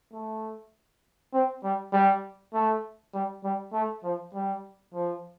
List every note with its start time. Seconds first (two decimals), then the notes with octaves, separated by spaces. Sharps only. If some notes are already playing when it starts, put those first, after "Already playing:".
0.12 A3
1.33 C4
1.64 G3
1.93 G3
2.54 A3
3.14 G3
3.44 G3
3.73 A3
4.04 F3
4.34 G3
4.94 F3